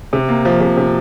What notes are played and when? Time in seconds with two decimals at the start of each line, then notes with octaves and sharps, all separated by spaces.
0.13 C3
0.29 A#3
0.45 F3
0.61 C3
0.77 C3